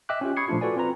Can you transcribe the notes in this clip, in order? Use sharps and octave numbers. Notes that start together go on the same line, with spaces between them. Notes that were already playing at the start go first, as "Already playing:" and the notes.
D#5 E5 G5 D6 F#6
C#4 F4 G4
B5 C#6 D#6 G#6 C7 C#7
A#2 F3 A3 D4 F4
F4 F#4 A4 B4 D5 G#5
C4 F4 B4 A#5